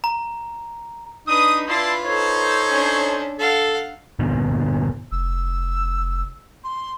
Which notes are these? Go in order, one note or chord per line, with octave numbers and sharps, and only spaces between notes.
A#5
D4 D#4 B4 D#6
E4 F4 B4 D5 A5 C6
D#4 A4 C5 C#5
C#4 D4
A4 F5 F#5
G2 A#2 D3 B3
F1 E6
C6